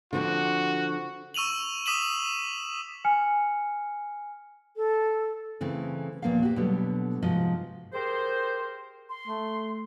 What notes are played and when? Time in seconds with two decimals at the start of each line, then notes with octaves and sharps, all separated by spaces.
0.13 D3 F3 C4 F#4
1.34 C#6 E6 D#7 F7 F#7
1.86 D6 D#6 B6 D#7 E7 F#7
3.05 G#5 F6 C#7
4.76 A4
5.61 C#3 E3 A3 C4
6.22 D#2 A#2 F3 A#3 B3 F5
6.43 F#4 G4
6.56 B2 D3 F#3 G3 B3
7.22 G#2 C3 F3 F#4 D#5
7.93 G4 G#4 A#4 C5
9.09 C6
9.27 A3